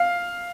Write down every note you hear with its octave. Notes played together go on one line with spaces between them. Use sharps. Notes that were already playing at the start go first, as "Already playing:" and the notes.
Already playing: F5